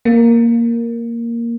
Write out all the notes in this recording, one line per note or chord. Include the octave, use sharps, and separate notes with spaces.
A#3